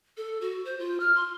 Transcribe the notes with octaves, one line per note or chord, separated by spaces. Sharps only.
A4
F#4
C5
F4
F6
C6